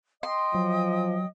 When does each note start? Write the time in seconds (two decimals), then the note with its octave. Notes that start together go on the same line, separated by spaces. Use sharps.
0.23 D#5 G5 C6 D#6
0.55 F3 F#3